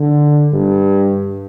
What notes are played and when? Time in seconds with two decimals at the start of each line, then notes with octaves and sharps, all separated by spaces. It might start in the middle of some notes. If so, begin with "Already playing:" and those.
Already playing: D3
0.53 G2